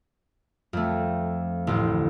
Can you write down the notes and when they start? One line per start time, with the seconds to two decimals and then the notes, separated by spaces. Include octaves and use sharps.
0.73 F2 A3
1.67 A1 D2